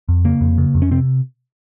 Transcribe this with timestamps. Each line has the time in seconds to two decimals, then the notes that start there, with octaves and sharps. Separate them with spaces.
0.09 F2
0.25 C#3 A#3
0.41 F2
0.58 C#3
0.75 F2
0.82 C#4
0.91 C3 C4